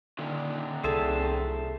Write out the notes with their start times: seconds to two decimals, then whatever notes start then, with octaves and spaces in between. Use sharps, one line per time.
0.19 A#2 D3 D#3
0.84 C2 G#4 A4 C5 E5 A5